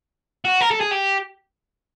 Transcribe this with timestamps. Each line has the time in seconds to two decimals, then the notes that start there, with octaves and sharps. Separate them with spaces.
0.45 F#4
0.61 A#4
0.71 A4
0.80 G#4
0.91 G4